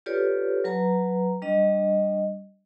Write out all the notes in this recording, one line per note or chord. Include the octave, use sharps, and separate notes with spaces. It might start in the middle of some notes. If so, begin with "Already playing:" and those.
F4 G4 A4 B4 C#5 D5
F#3 B4 A#5
G3 D4 D#5